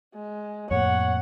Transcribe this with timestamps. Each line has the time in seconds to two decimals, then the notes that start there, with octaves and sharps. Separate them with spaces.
0.15 G#3
0.71 F2 A2 A#3 C#5 F#5